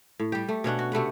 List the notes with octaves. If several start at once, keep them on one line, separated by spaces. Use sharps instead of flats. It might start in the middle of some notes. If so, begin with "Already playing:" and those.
A2
G3 G4
A3
B2 C#4 D4 F#5
F#4
C3 A3 B4 F#5